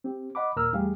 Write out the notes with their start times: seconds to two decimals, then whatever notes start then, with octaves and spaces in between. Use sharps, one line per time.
0.04 C4 G4
0.35 D#5 F#5 B5 D6
0.56 D#2 A#2 A#4 A#5 E6 F6
0.73 E2 G3 A3 G4 G#4 F5